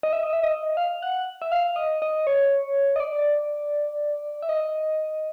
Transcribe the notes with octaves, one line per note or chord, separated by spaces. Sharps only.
D#5
E5
D#5
E5
D#5
F5
F#5
E5
F5
D#5
D#5
C#5
D#5
D5
E5
D#5